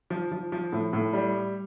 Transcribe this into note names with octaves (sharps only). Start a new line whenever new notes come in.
F3
F3
F3
A2
A2
G3